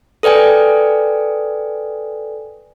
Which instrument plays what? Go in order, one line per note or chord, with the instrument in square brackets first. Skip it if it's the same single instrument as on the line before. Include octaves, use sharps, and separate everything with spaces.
[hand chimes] A4 B4 D5 G5 G#5